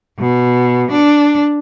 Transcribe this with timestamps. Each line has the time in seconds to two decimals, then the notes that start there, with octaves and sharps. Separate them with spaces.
0.19 B2
0.92 D4